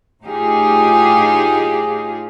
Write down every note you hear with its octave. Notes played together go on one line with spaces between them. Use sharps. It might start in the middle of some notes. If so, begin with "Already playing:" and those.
A2 D#4 F4 G4 G#4